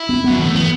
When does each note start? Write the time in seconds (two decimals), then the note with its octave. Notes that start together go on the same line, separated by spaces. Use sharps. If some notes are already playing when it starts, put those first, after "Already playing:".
Already playing: E4
0.09 B3
0.24 F#3 B3
0.39 E3 A3
0.55 E3 B3